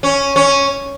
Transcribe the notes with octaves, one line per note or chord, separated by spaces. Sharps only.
C#4
C#4